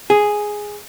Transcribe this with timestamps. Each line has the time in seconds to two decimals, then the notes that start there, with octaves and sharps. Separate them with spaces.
0.10 G#4